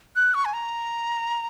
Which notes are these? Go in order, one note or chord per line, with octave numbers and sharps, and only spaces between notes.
F#6
C#6
G#5
A#5